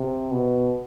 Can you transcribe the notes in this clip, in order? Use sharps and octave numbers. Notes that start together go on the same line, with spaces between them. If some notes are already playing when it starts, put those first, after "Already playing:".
Already playing: C3
B2